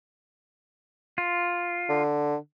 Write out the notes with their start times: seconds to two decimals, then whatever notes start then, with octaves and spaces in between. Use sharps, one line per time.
1.18 F4
1.89 D3